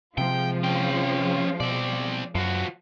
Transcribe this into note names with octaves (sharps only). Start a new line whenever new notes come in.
C3 F3 G#3 F4 G5
C#4 G5
B2 C4 D5
F#2 F3 F#4